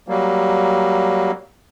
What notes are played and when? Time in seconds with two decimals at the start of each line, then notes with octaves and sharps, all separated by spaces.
0.08 F#3 G3 A#3